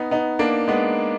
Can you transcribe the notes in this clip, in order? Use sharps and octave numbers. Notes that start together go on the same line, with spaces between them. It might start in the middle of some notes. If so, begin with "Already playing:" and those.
Already playing: B3 D#4
B3 D#4
A#3 D4
G#3 B3